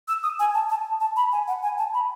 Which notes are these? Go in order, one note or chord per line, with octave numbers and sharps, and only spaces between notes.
E6
D#6
G#5
A5
A5
A5
B5
G#5
F#5
G#5
A5
B5